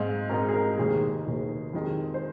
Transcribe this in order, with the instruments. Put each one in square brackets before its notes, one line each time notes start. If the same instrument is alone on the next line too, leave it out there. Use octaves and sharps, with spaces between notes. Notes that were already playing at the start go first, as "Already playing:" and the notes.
Already playing: [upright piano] G#2 G#3 C4 D#4 F5
G#2 G#3 C4 D#4 A#4
G#4
A#4
F1 D#2 D#3 G#3 G#4
F1 D#2 D#3 G#3
F2 C3 D#3 G#3
C5